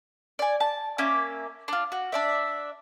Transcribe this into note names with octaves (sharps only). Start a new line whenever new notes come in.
D5 G#5
A5
A#3 C#4 E5 D6
D4 F4
F#4
D4 D5 E5